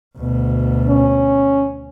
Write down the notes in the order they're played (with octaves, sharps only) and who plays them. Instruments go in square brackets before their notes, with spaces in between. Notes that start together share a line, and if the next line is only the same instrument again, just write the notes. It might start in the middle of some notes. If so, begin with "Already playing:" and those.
[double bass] D2 B2
[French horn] C#4